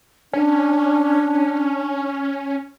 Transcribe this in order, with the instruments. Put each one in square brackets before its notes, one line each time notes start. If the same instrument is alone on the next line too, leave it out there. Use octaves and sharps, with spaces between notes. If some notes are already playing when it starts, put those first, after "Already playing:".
[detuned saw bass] C#4 [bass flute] D4